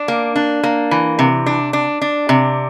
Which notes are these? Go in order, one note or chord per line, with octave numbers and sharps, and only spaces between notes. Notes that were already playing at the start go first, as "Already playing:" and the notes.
Already playing: D4
A#3
D4
A#3
E3
C3
D4
D4
D4
C3